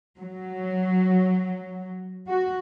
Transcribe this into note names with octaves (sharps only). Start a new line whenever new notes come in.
F#3
F#4